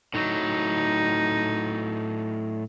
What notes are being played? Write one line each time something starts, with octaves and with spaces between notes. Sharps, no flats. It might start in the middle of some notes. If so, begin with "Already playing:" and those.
A2 F#3 D#4